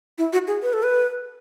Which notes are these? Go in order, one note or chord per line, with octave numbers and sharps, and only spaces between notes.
E4
F#4
G#4
B4
A4
B4